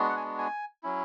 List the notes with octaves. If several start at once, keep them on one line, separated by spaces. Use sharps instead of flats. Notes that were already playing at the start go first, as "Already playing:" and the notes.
Already playing: G#3 B3 D4 F#4
F#5
G#5
G#5
F#3 C#4 E4